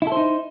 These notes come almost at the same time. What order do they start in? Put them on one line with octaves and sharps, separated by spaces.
E4 A4 C5 D#4